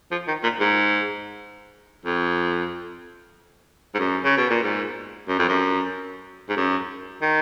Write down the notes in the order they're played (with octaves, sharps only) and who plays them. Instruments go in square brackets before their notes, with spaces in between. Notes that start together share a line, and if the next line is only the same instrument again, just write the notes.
[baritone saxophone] F3
D#3
A#2
G#2
F2
G#2
F#2
C#3
B2
A#2
G#2
F#2
F2
F#2
G#2
F#2
D#3